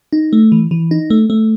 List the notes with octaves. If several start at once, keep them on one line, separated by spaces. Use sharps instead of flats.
D#4
A3
E3
E3
D#4
A3
A3